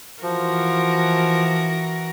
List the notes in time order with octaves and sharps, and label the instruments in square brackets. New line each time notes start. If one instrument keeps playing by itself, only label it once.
[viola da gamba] E3 F#4 A#4 [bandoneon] F3